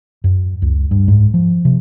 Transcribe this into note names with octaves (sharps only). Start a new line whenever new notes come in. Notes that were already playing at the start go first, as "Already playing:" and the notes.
F#2
C#2
G2
G#2
F3
C3